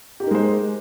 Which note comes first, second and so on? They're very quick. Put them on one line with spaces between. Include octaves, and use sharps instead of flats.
G4 D#4 A#4 G#3 C5